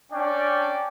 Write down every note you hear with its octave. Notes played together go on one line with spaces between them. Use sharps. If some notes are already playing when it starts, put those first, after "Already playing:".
C#4 D4 D5 G5